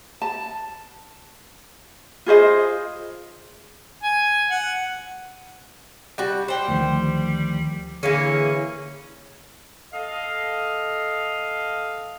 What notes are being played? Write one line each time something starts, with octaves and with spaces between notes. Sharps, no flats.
A5
F4 G#4 C5 D#5
G#5
F#5
G3 F#4
G3 C5 G5
D2 D#3 F3
D3 E3 A#3 C#4 G#4
A4 D#5 F5